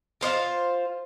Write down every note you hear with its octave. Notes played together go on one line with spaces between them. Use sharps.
F4 C5 D5 F5